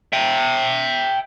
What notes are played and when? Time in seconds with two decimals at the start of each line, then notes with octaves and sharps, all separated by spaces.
0.13 E5 G5